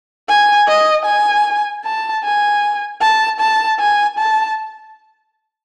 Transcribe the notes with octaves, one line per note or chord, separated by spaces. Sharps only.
G#5
D#5
G#5
A5
G#5
A5
A5
G#5
A5